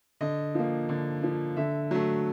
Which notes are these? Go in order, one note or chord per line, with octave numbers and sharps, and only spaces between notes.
D3 D#5
F3 A#3
D3
F3 A#3
D3 E5
F#3 A3